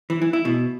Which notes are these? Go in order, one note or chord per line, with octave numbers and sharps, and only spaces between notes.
E3
E3
E4
B2